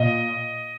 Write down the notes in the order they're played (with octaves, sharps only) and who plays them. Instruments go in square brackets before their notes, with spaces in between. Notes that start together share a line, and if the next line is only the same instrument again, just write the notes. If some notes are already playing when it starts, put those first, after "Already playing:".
Already playing: [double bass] A#2 [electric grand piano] D#5